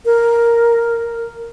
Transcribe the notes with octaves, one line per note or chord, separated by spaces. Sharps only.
A#4